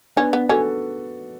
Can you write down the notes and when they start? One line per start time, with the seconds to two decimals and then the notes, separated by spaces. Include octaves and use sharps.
0.16 B3 C#4 D4
0.33 B3
0.49 C#4 F#4 A4